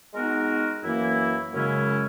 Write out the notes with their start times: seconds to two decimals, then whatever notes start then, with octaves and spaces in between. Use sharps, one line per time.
0.14 G#3 B3 D#4 F#4 A#4
0.83 F#2 E3 A#3 E4
1.52 F#2 C#3 G#3 C#4 E4